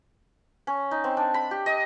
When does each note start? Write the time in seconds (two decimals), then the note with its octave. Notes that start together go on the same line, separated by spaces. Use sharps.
0.67 C#4
0.91 D#4
1.04 C4
1.17 D4
1.34 B5
1.51 G4
1.66 D#5